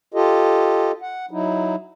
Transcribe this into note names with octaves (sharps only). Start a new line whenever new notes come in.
F4 G4 A4 D#5
F#5
F#3 D#4 E4